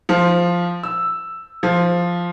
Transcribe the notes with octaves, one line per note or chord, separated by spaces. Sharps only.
F3
E6
F3